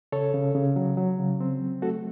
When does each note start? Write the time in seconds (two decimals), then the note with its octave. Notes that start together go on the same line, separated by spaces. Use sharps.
0.12 C#3 A4 C#5
0.34 C#3
0.55 C#3
0.76 F#3
0.97 F#3
1.19 C#3
1.40 C4
1.61 F#3
1.82 A3 F#4 A4